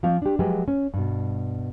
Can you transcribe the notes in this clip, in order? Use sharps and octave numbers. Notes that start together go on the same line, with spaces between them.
F3 C4 F5
D4 G4
F3 F#3 G#3 G4 G#4 B4
C#4
G2 B2